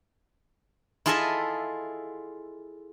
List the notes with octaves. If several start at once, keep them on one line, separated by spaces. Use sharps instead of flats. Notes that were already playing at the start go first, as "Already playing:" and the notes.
E4 F4 G#4 A4 D#5 E5